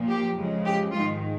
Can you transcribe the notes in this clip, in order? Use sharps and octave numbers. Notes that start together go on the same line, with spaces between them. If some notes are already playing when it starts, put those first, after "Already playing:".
Already playing: A#2 F3 A#3
G4
F2 C#3 F3 G#3
G4
G#2 D#3 G#3 F4